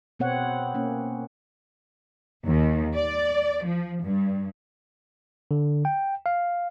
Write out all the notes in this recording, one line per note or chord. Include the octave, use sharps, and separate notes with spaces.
B2 B3 C4 C#5 F#5
A#3 C#4
D#2
D5
F3
G2
D3
G5
F5